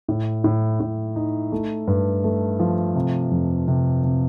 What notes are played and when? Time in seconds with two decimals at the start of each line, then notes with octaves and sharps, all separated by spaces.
0.08 A2
0.44 A2
0.80 A2
1.16 D#4
1.52 A3
1.87 G2
2.24 A3
2.60 F3
2.96 C3
3.31 F2
3.68 C3
4.04 C3